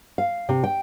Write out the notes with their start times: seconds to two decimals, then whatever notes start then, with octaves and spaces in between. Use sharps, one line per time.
0.18 F5
0.49 C3
0.64 G5